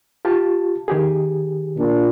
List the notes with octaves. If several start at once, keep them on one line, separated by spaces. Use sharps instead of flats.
F4 G4 A5
D#3 G4 G#4
A#2 D4 F4